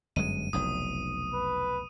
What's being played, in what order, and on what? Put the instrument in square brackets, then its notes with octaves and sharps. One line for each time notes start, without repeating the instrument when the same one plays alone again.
[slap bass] G1 F#2 G#3 [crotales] D#7
[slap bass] F1 B1 E2 [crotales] D#6
[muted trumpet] B4